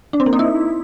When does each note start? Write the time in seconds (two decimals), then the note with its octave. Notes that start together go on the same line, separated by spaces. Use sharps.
0.13 D4
0.20 C4
0.26 A#3
0.33 D#4
0.39 E4